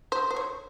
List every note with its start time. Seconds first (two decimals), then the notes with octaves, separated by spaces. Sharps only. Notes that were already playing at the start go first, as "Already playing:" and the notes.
0.12 C5
0.31 C5
0.36 C#5